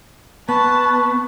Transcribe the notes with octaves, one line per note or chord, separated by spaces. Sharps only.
B3 A5 B5 C#6